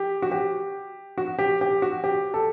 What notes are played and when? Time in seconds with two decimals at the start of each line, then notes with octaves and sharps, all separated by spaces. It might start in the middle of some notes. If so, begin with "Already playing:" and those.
Already playing: G4
0.22 F#4
0.31 G4
1.18 F#4
1.39 G4
1.61 G4
1.82 F#4
2.04 G4
2.34 A4